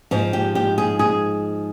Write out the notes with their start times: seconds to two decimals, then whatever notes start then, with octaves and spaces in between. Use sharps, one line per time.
0.11 G#2 F3 G#3
0.33 G4
0.55 G4
0.78 G#4
0.99 G#4